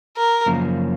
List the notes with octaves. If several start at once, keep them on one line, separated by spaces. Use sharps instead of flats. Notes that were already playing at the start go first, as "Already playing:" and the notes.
A#4
F#2 C#3 F3 A#3 C#4